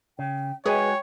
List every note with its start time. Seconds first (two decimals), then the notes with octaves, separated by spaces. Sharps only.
0.19 C#3 G5
0.66 G#3 F#4 G#4 B4 C#5 D#5 G5 G#5